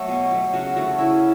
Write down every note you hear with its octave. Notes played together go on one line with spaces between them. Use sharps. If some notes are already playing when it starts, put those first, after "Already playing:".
Already playing: F#3 A3 B3 A4 C#5
B2
F#3 A3
C#3 F#4
F#3 A3 F#4
C#3 E4